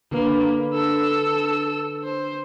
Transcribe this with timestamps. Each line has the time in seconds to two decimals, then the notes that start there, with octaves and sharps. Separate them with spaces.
0.12 D3 A#3 B4
0.74 A4 E6
2.04 C5